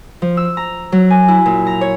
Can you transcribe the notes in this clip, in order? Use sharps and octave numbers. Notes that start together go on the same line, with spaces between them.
F3
E6
A#5
F#3
G#5
E4
A#2
A#5
C#5